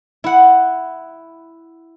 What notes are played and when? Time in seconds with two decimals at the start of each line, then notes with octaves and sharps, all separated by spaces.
0.24 E4 F#5